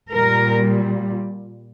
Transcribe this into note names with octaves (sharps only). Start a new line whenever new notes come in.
A#2 G3 A#4